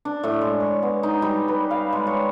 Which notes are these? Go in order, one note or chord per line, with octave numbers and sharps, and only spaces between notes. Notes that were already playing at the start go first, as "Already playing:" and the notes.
D4
A2
G#3
C#5
B3
D#4
G3
B4
F5
G#3
C#5